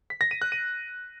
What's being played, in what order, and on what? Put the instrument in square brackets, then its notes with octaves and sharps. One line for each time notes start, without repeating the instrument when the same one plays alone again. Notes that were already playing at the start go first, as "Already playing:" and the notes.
[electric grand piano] B6
A#6
D#7
F#6
D#7